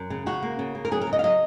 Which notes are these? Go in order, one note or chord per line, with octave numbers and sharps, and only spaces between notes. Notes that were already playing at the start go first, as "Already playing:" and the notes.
Already playing: F#2
C#3
C#3 F#4
A#3
C#3
A#3
A#4
F#3 G#4
A#4
C#3
D#5
F5
F#3 D#5